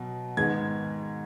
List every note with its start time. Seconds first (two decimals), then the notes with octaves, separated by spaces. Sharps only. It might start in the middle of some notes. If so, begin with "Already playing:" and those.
Already playing: B2 F#3
0.37 G#2 D#3 G#3 B3 G#6